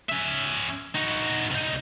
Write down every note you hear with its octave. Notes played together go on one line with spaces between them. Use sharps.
C#4 E5
D#4 F#4
C2 D#4